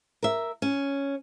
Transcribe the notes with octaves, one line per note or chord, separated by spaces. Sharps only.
A#4 E5
C#4